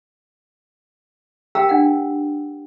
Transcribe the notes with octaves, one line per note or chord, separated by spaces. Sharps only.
G4 A#4 F5 G5 A#5 E6
D4 F#5